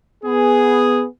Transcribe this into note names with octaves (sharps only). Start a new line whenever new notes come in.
B3 G#4